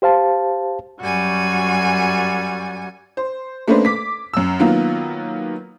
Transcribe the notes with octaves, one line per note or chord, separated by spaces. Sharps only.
G4 C5 F5 A5
F#2 G3 F#4 G#5
C5
A3 A#3 C#4 D4 B4 C5
D6 B6
F#2 E6
D#3 F#3 A#3 B3 F4